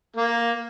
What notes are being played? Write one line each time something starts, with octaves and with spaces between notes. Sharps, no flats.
A#3